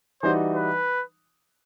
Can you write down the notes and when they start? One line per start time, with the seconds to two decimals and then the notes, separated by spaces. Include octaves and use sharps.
0.23 E3 G3 D#4 F#4 C5
0.55 B4